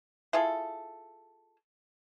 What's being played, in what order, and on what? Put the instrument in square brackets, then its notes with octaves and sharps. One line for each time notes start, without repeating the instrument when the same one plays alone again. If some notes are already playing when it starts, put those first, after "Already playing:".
[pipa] E4 F4 G#4 A4